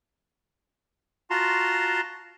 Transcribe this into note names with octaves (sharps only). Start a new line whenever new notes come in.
F4 F#4 A5 A#5 C6